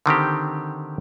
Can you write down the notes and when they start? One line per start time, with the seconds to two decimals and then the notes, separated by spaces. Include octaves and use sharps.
0.06 D3 D#3 C4 G4